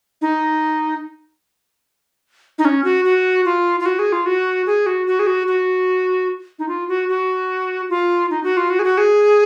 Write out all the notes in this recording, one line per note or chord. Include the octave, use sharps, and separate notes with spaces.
D#4
D#4
C#4
F#4
F#4
F4
F4
F#4
G#4
F4
F#4
G#4
F#4
F#4
G#4
F#4
F#4
D#4
F4
F#4
F#4
F4
D#4
F#4
F4
F#4
G#4
F#4
G#4